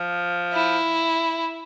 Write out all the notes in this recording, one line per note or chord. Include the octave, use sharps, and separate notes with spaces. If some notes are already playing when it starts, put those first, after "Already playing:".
Already playing: F3
E4